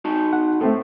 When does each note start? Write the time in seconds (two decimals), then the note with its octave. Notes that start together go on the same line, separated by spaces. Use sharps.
0.05 D#4 F#4 A5
0.33 F#5
0.61 A2 A3 C4 A4